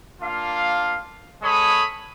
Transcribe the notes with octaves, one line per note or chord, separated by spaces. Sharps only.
A#3 D4 F4 F5
G#3 A4 C#5 B5 D#6